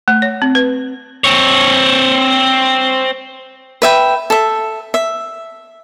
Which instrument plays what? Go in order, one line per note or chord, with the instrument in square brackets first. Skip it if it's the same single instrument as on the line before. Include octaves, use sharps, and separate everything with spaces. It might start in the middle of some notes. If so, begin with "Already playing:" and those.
[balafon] A3
C#5
C4
B4
[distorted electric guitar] C4 C#5
[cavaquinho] B4 E5 G5
A4 E5
E5